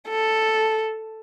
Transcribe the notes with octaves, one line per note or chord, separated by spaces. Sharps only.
A4